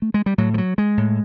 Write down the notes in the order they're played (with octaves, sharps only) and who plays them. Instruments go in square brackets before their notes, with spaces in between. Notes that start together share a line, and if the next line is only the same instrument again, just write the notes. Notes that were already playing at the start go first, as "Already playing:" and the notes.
[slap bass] A3
G#3
G3
A2 F#3
F3
F#3
G#3
A2